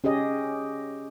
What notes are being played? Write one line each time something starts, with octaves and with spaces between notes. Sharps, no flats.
C#4 G4 G#4 D#5